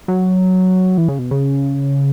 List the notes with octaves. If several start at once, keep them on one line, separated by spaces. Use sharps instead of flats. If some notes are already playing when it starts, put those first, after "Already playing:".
F#3
E3
C#3
B2
C#3